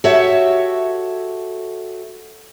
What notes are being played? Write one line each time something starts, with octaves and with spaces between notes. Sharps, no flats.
F#4 G4 A4 C#5 E5